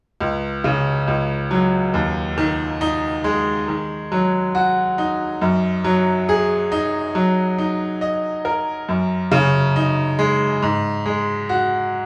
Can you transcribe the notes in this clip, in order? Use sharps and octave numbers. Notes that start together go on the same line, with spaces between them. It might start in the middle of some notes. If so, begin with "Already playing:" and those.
C#2
C#3
C#2
F#3
D#2
D#3
D#4
G#3
D#3
F#3
F#4
D#4
F#2
F#3
G#4
D#4
F#3
D#4
D#5
A#4
F#2
C#3
D#4
G#3
G#2
G#3
F#4